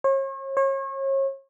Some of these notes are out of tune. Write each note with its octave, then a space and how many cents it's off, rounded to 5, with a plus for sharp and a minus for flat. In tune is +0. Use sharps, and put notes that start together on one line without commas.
C#5 -40
C#5 -35